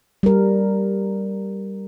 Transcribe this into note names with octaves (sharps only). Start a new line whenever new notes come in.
G3 A#4